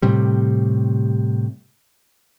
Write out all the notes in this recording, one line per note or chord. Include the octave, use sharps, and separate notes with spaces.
A2 C3 G3